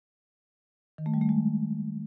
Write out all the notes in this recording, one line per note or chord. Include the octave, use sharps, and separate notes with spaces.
D#3
A3
G3
A3
G#3